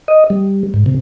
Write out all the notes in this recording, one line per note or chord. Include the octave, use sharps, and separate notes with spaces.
D#5
G3
G#2
C3